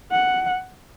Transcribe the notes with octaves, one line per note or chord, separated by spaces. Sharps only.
F#5